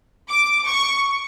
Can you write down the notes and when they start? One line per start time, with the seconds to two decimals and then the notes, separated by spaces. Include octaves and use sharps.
0.30 D6
0.68 C#6